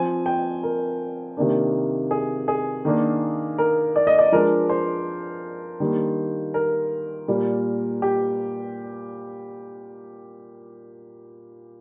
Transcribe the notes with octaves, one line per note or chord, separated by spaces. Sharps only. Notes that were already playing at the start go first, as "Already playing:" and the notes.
Already playing: F3 C4 G#5
G5
A#4
C3 D#3 A#3 D4
G#4
G#4
D#3 A#3 D4
A#4
D5
D#5
D5
F3 G#3 D4 A#4
C5
D#3 G3 A#3 D4
A#4
A#2 G3 A#3
G4